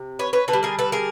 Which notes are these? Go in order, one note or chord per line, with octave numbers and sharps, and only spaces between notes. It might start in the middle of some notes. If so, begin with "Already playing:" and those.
Already playing: C3
B4 C#5
B4 C#5
D3 A4 B4
G3
G#4 A#4
A4 B4
G#4 A#4